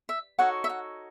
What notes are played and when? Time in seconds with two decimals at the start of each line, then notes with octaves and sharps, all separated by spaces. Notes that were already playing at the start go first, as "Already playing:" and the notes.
0.09 E5
0.39 D#4 F#4 A4 C#5 F#5
0.64 E5
0.69 F#5